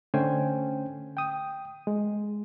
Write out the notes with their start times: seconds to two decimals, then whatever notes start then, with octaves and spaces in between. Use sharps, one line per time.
0.14 D3 A3 C#4 C5 G5 G#5
1.17 G5 D#6
1.87 G#3